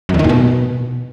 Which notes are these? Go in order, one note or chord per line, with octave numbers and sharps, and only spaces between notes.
F#2
E2
D#3
A#2
B2